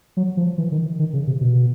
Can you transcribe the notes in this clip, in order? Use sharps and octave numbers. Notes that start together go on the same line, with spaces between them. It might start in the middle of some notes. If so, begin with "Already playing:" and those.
F#3
F3
E3
D#3
D#3
C#3
C3
B2